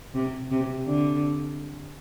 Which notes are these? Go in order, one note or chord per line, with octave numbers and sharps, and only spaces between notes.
C3
C3
D3